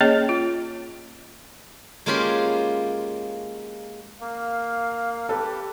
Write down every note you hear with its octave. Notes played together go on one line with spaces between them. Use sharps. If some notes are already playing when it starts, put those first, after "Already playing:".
A#3 C#4 G#4 C#5 D#5 G5
F4
G#3 A#3 C#4 F4 G4 B5
A#3 F5
G4 A4 B4